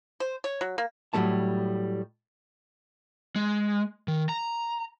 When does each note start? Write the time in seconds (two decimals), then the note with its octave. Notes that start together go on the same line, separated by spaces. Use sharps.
0.20 C5
0.44 C#5
0.61 F#3
0.78 A#3
1.13 A2 F#3 G3 A3 A5
3.36 G#3
4.08 D#3
4.29 A#5